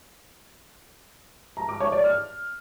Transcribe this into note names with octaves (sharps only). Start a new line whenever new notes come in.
A#5
D6
C#5
D5
F6